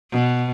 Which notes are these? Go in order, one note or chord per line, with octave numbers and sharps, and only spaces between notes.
B2